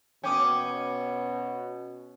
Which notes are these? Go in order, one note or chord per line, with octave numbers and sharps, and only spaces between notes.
B2 C#4 G5 D6 D#6